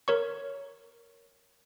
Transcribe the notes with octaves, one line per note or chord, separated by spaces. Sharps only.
A#4 C#5 C#6